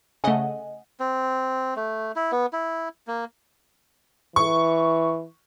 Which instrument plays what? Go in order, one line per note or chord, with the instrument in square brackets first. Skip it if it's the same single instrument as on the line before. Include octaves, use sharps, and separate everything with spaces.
[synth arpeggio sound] C#3 A3 [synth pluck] D#5 F#5 G#5
[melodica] C4
A3
E4
B3
E4
A#3
[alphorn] E3 [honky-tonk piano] C#6